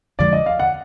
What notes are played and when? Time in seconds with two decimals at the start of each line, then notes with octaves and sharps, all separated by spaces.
0.19 F2 D3 F3 G#3 D5
0.33 D#5
0.46 F5
0.60 F#5